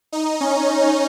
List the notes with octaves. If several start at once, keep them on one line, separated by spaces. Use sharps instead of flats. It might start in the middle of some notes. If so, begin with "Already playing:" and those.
D#4
C#4